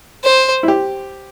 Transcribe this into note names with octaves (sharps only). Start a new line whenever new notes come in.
C5
E4
G4